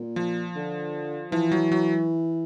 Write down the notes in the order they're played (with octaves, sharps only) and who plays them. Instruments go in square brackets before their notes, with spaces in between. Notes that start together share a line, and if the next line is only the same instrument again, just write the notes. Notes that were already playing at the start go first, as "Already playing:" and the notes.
Already playing: [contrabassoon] A#2
[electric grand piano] F3
[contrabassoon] D3
[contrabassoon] E3 [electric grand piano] F3
[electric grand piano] F#3
F#3